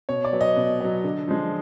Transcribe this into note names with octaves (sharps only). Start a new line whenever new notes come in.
B2 C#5
D5
F#3 B3
D#5
B2
F#3 B3
D3
F3 G#3